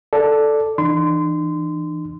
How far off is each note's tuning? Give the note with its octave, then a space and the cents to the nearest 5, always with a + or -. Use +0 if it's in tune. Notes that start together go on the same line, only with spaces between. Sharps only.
A4 +0 D5 +0
E3 +0 D4 +45 C6 -25